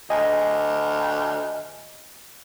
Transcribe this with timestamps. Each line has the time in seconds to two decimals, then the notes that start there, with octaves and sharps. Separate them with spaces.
0.10 D2 D#5 G#5